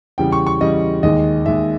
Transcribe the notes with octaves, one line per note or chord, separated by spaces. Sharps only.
E2 C#3 G3 G5
C#6
C#6
E2 C#3 G3 D#5
D#2 D#3 G#3 D#5
D#2 D#3 G#3 E5